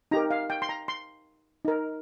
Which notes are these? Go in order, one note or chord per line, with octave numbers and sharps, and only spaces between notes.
D#4 G4 A#4 A#5
F5
G5
C6
A#5
C6
D#4 A#4